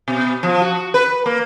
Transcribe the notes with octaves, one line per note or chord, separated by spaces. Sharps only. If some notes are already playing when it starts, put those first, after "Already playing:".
B2
F3
F#4
B4
A#3